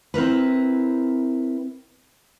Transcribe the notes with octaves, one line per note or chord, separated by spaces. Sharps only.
C4 E4 A#4 B4